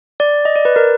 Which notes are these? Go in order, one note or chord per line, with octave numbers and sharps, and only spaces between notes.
D5
D#5
D5
B4
A#4